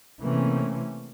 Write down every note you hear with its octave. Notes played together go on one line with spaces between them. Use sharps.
C3 E3 A3 A#3 C4 C#4